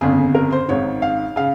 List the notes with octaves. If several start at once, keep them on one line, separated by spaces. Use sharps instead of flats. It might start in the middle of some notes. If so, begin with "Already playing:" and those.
G1 F2 C#3 G#4
A#4
C5
G#1 G#2 D#3 C#5
F5
C#3 F5